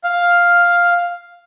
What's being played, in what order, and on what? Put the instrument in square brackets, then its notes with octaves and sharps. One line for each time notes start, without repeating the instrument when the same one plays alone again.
[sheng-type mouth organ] F5